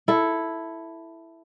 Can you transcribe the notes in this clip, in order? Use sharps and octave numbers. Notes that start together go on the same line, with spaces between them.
E4 A4